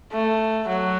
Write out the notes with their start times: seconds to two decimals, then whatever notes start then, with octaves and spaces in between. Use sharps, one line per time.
0.13 A3
0.68 F#3